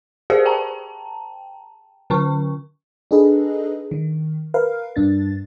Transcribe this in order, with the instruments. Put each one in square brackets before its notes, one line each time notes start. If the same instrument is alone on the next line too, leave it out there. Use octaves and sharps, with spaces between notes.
[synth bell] G4 G#4 A#4 C5 D5 F5
G5 A5 A#5
D3 C#4 C#6
[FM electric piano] D4 D#4 G#4 A4 B4 D#5
D#3
A#4 B4 F5
G2 D4 A6